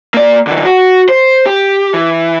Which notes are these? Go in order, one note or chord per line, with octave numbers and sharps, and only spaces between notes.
A#3 D5
D3 E3
F#4
C5
G4
E3